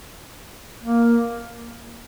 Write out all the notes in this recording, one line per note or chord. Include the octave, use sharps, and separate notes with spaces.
A#3